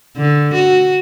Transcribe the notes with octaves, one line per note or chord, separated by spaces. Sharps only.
D3
F#4